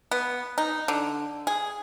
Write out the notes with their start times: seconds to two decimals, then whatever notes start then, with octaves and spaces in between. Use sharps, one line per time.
0.11 B3
0.58 D#4
0.88 D3
1.47 G#4